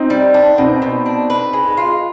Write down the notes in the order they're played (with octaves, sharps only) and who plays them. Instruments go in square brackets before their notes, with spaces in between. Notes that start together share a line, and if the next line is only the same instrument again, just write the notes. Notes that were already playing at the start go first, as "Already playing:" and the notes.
Already playing: [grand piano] C4 D#4
[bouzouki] G3
D4
[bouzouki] B2 [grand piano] C4 D#4
[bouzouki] B2
D4
B4
G#3
F4